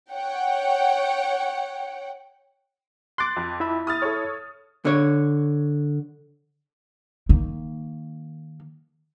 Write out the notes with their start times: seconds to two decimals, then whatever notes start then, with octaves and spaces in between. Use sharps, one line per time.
0.11 C#5 F#5 G5
3.18 C6 D6 F#6 A6
3.36 F2
3.60 E4 E5 B5
3.87 D#6 F6 A6
4.02 A4 C#5
4.85 D3 C#5
7.29 D#3 A#3